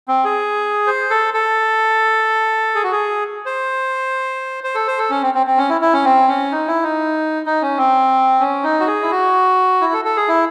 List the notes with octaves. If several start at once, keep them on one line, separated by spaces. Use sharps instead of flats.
C4
G#4
C5
A4
A4
G#4
F#4
G#4
C5
C5
A4
C5
A4
C#4
C4
C4
C4
C#4
E4
E4
C#4
C4
C#4
D#4
E4
D#4
D#4
C#4
C4
C#4
D#4
F#4
G#4
E4
F#4
E4
A4
A4
G#4
E4